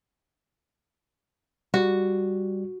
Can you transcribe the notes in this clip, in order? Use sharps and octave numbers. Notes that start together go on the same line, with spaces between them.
G3 F#4